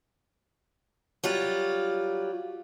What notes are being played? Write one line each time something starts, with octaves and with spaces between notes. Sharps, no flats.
F#3 G3 F4